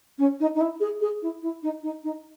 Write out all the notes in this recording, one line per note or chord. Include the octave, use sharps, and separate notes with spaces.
C#4
D#4
D#4
E4
G#4
G#4
E4
E4
D#4
D#4
D#4